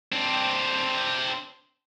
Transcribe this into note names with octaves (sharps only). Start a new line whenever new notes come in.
C4 D4